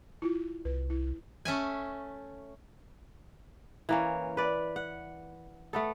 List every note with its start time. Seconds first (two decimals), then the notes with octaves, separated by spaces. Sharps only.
0.22 E4 F4
0.65 C2 B4
0.90 E4
1.45 A3 C#4 E5 G#5
3.89 E3 A#3 C#4
4.37 B4 D5
4.76 F#5
5.73 A3 B3 A4